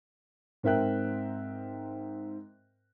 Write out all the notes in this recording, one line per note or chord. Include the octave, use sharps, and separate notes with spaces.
G#2 C4 A#4 E5 G5 F#6